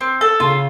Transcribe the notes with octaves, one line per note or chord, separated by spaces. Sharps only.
C4
A4
C#3 F4